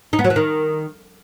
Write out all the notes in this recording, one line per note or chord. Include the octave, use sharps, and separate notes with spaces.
D#4
B3
F#3
E3
D#3